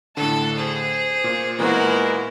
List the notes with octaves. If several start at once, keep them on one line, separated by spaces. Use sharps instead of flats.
A2 D3 A4 A5
G#4 C5
A#2
A#2 E3 G#3 A#3 B3 E4 F#4 A#4